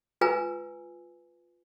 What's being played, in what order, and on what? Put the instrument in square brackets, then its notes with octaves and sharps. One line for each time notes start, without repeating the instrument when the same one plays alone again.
[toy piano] F4 B4 G#5 A#5 E6